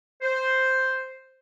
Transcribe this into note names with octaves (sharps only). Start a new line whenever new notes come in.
C5